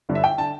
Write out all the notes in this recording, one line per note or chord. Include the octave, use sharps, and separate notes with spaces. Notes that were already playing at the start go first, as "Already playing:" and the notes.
G1 G2 D3
E5
G5
D3 A5